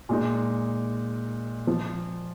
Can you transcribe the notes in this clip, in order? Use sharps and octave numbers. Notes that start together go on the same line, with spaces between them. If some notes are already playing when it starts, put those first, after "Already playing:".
A#2 G#3 D#4
F3